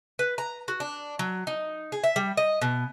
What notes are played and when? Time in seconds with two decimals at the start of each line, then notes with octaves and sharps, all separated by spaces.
0.19 B4
0.38 A#5
0.68 F#4
0.80 D4
1.19 F#3
1.47 D#4
1.92 G#4
2.04 E5
2.16 G3
2.37 D#5
2.62 B2